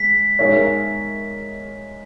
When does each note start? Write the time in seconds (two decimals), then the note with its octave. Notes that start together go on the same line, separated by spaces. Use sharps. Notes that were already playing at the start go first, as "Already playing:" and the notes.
Already playing: G#3 B6
0.39 G#3 D#4 A#4 C#5 E5